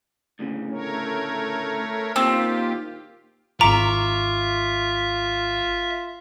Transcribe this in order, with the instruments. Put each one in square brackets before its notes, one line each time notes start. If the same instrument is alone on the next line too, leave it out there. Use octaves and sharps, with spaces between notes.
[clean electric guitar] D2 A2 C#3
[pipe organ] A3 A#4 C#5
[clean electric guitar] A#2 D#3 [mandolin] C4 [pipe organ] F4 G4
[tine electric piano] G#1 C#6 D6 [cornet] F4 [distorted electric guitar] E5 [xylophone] A#5